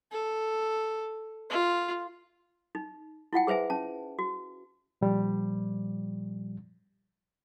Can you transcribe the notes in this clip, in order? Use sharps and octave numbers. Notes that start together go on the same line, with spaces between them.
A4
F4
D#4
E4 F4 F#5 G5
G#4 B4 C5 E5 G#5
C#4 A5
F#4
A#2 F3 G3